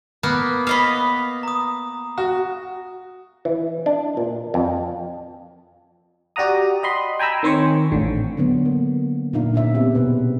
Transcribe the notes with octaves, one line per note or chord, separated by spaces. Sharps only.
A#3 B3
B3 D#5 F5 B5
A#5 D#6
F#4
E3
D4
A#2
F2
F#4 G4 D5 F#5 A#5 D#6
D#5 B5 C6
G5 G#5 A#5 B5 E6
D#3 C4 C5 C#5 C#6
A1 D3
D3 F#3 B3
A#3
A#2 A#3 D4 D#4 E5 F5
A#2 C#4 E5
B3 C4 G4 G#4
B2 G#4 B4 C5